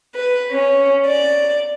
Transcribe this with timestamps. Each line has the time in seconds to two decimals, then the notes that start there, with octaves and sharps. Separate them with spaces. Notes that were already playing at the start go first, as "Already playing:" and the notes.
0.16 B4
0.53 C#4
1.07 D5